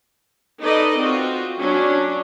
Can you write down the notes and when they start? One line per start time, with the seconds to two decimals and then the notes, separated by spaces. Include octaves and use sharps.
0.62 D#4 A4 B4 D5 D#5
0.98 C4 F4 F#4
1.60 F#3 C#4 D4